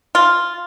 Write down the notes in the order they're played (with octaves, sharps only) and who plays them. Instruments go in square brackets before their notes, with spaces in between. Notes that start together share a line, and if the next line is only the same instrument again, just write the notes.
[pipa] F4